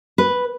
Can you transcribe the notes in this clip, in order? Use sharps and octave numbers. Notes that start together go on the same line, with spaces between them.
B4